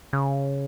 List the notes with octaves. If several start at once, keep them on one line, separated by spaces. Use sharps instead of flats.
C#3